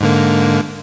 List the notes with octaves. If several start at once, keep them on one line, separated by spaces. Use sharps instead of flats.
G#2 D3 A#3